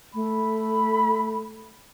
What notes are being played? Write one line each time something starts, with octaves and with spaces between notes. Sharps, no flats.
A3 B5